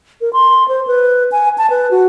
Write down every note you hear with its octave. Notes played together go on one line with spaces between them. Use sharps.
A#4
C6
C5
B4
G#5
A5
B4
F#4